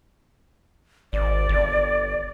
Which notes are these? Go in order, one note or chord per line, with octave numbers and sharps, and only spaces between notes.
G#1 D5
G1